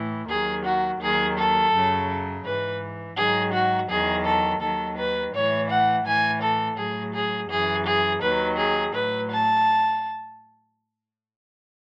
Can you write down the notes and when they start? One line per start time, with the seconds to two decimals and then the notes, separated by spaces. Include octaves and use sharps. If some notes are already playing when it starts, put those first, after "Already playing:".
Already playing: A2 E3
0.28 D#2 D#3 F#3 G#4
0.64 F#4
1.00 D#2 D#3 F#3 G#4
1.37 A4
1.72 F#2 C#3 F#3
2.45 G#2 E3 B4
3.16 G#2 D#3 F#3 G#4
3.52 F#4
3.88 E2 D#3 F#3 G#4
4.24 A4
4.60 D#2 D#3 F#3 A4
4.97 B4
5.32 A2 E3 C#5
5.69 F#5
6.05 A2 E3 G#5
6.41 A4
6.77 A2 F#3 G#4
7.13 G#4
7.49 F#2 E3 G#4
7.85 G#4
8.21 D#2 D#3 F#3 B4
8.57 G#4
8.93 A2 F#3 B4
9.30 A5